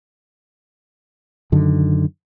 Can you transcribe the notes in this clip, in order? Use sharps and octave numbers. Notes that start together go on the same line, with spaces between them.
F#2 D3 D#3